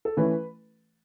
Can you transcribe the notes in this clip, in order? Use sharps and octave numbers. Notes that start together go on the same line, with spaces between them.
A4
E3 A3 C#4 B4